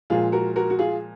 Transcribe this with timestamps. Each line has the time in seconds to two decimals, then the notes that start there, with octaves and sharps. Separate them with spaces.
0.10 A#2 F3 G#3 F4 G#4
0.32 F#4 A#4
0.56 F#4 A#4
0.70 F#4
0.79 F4 G#4